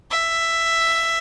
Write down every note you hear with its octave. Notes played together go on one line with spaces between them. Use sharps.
E5